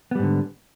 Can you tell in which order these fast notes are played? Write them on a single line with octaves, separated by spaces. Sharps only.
B3 G3 G#2 D3